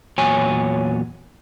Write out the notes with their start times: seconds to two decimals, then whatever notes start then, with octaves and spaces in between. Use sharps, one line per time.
0.18 E2 A#2 F#3 C#5 G#5